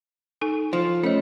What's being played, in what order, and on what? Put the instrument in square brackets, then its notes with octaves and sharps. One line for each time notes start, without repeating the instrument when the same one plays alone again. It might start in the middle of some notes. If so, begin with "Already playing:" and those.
[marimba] D#4 A4 G#5
[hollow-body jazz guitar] F3
[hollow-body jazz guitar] A3 [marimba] C#4 C#5 D#5